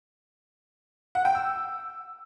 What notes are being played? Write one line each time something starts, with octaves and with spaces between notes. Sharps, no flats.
F#5
G5
E6